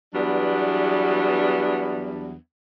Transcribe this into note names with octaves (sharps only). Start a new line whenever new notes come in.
E2 F#3 G3 B3 D4